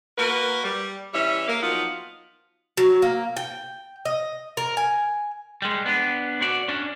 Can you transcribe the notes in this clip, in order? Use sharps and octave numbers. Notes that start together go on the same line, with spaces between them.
A#3 F#4 A#4 B4
G3
E3 G3 C#4 E5
A#3
F3 F#3 B3 D#4 F4
F#3
A#3
G5
D#5
A#4
G#5
G3 G#3
B3 D4
F#4 D5
C#4 D4